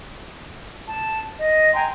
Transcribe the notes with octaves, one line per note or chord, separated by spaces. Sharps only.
A5
D#5
G5 G#5 A#5 C6